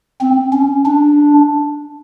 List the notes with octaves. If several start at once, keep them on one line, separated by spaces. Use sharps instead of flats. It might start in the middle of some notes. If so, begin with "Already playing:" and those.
C4
C#4
D4